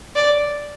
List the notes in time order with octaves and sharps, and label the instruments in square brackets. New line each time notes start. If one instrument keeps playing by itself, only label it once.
[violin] D5